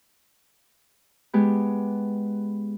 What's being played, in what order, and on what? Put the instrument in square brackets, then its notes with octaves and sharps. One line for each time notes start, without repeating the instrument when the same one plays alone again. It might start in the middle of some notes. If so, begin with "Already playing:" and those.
[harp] G#3 B3 G4